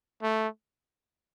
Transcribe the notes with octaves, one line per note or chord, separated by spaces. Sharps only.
A3